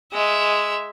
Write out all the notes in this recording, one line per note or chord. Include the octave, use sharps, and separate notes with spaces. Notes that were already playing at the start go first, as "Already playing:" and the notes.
G#3 E5